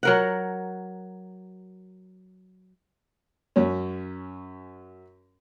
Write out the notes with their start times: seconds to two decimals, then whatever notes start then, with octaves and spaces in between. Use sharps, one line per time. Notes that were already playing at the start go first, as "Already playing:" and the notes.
0.03 F#3 A#4 F#5
3.56 F#2 C#4